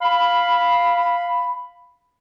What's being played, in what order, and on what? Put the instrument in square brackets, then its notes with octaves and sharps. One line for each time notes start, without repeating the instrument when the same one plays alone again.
[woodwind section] F5 B5